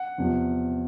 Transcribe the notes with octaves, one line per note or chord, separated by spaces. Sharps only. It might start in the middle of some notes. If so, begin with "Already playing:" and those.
Already playing: F#5
E2 C3 F3